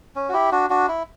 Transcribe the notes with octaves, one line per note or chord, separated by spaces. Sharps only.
C#4
F#4
E4 G4
D4 F#4
D4 F#4
E4